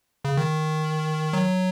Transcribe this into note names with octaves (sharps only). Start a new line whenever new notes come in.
C#3
D#3
F#3